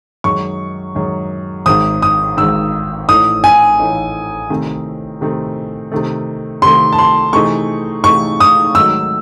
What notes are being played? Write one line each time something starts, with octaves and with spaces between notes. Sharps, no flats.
F#2 D#3 G#3 C#6
F#2 D#3 G#3
G#1 G#2 D#3 D#6
D#6
G#1 G#2 D#3 E6
A1 A2 E3 A3 D#4 D#6
G#5
A1 A2 E3 A3 D#4
C3 D#3 A3 C4
C3 D#3 A3 C4
C3 D#3 A3
C3 D#3 A3 C6
A5
C6
C3 E3 A3 D#4 G#4 C#6
C3 E3 A3 D#4 G#4 C#6
D#6
G#2 D#3 F#3 A3 D#4 E6